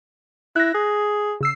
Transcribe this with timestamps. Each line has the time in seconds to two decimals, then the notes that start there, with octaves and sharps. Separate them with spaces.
0.56 E4 F#6 A#6
0.75 G#4
1.41 C#3 E6 C7